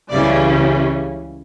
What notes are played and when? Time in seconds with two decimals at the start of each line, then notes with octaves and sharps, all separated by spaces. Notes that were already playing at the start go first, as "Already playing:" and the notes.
0.10 C#2 C#3 E3 G3 C#4 D5